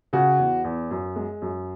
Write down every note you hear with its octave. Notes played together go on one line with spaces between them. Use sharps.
C#3 F#4
E2
E2
F#2
G#3
F#2